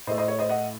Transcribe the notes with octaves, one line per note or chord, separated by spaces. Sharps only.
A2 A3 C5 D#5
C5 D#5
C#5
C5 D#5
D#5 F#5